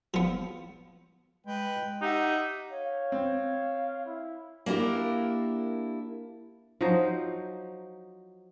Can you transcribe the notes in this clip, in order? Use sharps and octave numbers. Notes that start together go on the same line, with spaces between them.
F3 B3
G#3 B4 G5
D#4 G4 E5 F#5
C#5 F5
C4
E4
A#3 D4 E4 G4 A#4
F3 F#3 D#4 C5